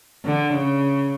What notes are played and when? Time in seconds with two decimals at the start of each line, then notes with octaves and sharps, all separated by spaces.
0.25 D3
0.54 C#3